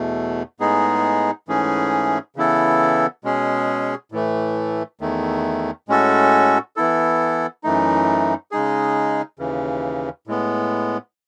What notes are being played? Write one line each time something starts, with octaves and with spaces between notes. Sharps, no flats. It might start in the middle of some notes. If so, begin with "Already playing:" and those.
Already playing: E2 B2 A3
A2 G#3 B3 D#4 G#4
G#2 E3 A3 C#4 G#4
C#3 E3 B3 E4 A4
B2 G#3 C#4 G#4
A2 E3 A3
E2 D#3 A3
A2 G#3 C#4 F#4 A4
E3 B3 E4 A4
F#2 E3 A3 D#4
C#3 G#3 D#4 G#4
D#2 C#3 E3
A2 G#3 B3